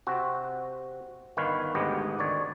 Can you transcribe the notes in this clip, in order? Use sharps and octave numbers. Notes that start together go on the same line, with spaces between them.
C3 C4 F#4
G1 D#3 B4 C#5 F5
G#1 D2 G#2 B3 G4 D#5
D2 D#3 C#5 D5